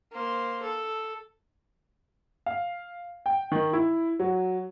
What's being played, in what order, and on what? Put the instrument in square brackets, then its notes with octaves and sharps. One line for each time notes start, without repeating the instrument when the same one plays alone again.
[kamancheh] A#3 C5
A4
[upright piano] F5
G5
D#3
E4
F#3